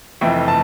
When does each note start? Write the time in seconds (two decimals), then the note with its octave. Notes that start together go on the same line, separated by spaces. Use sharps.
0.21 F1 F2 E3 A3 G5
0.48 A5